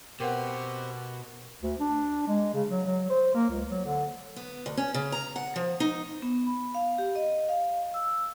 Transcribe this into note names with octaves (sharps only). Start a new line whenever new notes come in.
B2 C4 G4 A#4 B4 F#5
D2
D4
G#3
C#3
F#3
F#3
C5
A#3
C#2
F#3
D3
B3
D2
C#4
C#3
A#5
F#5
F3
D#4
B3
B5
F5
G4
D#5
F5
E6